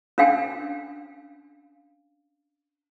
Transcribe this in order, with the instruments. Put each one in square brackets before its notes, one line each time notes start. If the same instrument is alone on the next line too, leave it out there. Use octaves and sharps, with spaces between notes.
[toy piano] C#4 D4 F5 G5 G#5